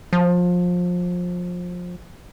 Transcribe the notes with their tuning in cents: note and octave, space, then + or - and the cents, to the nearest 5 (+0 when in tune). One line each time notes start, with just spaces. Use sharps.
F3 +25